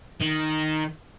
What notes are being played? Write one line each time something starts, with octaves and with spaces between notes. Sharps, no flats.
D#3